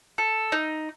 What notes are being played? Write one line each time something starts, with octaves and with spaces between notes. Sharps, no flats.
A4
D#4